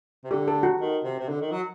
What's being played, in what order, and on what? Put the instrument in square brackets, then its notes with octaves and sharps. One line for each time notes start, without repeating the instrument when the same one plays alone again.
[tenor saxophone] C3
[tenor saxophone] D3 [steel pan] G4
[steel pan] A4
F#4
[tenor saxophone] D#3
C3
C3
D3
D#3
F#3